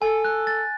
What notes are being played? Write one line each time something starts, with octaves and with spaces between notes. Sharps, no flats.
A4 G#5
F#6
A6